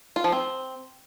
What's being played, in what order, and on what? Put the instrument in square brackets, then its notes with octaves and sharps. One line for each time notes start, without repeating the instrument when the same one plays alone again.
[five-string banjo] F4
F3
C4